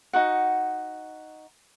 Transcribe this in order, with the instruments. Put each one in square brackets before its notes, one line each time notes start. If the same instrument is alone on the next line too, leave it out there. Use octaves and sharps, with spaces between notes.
[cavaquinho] D#4 F#4 F#5